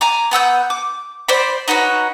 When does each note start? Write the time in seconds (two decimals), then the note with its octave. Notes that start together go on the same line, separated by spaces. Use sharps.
0.01 G#5 A#5 D6
0.31 B3 F#5 E6 G6
0.70 D6
1.29 C5 D5 B5
1.68 D#4 F#4 B4 C#5